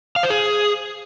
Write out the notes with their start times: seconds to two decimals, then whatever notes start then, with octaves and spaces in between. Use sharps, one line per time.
0.16 F5
0.23 C5
0.30 G#4